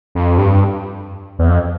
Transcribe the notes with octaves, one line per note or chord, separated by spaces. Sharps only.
F2
G2
E2
F2